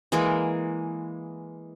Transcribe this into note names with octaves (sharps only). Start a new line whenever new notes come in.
E3 G#3 A#3